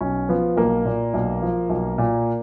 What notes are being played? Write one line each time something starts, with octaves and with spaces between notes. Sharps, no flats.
B1 C#4
F3 B3
B1 A#3
A#2
B1
F3
B1
A#2